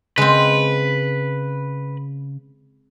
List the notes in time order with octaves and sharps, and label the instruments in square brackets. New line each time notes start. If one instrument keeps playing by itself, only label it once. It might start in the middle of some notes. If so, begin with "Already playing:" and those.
[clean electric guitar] C#3 [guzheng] G#3 C4 [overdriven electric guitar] B4